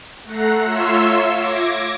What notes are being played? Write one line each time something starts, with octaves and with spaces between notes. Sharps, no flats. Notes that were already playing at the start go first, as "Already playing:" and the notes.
A3 F#5 A#5 A#6 C7
F4 C#5 E5 C6 E6
D6 G#6 A#6